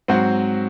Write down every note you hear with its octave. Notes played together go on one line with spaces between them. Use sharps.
G#2 F#3 C4 F#4 C5